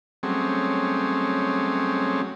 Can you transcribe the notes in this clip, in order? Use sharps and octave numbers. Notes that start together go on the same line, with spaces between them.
F#3 G3 A3 C4 C#4 G#4